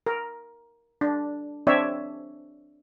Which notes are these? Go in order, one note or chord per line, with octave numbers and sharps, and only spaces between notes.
A#4
D4
C4 D4 C#5 D5 E5